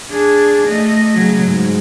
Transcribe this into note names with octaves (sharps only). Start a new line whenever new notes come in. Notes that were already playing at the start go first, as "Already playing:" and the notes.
D4 G#4
A3 D#5
C#3 F#3
G#2